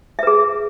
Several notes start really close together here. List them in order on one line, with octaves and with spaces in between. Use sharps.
E5 B4 G#4